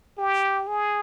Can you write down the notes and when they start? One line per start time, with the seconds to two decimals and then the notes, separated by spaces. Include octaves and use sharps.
0.18 G4
0.67 G#4